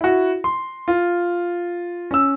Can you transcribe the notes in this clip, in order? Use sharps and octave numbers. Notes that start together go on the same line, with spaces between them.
E4 F#4
C6
F4
C#4 E6